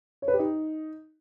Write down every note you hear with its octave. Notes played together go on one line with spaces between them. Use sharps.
C#5
B4
G4
D#4